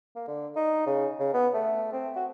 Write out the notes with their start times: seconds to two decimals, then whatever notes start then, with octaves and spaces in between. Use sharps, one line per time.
0.15 A#3
0.28 D3
0.56 D#4
0.87 C#3
1.20 C#3
1.33 B3
1.54 A3
1.92 C4
2.16 F#4